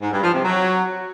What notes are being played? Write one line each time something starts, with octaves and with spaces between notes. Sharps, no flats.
G#2
G2
F3
C3
F#3